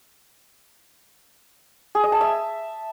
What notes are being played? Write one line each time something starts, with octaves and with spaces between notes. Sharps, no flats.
G#4
D#5
A5
E5